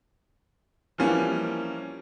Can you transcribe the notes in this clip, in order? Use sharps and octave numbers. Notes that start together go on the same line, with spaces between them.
E3 F3 G3 A#3 C#4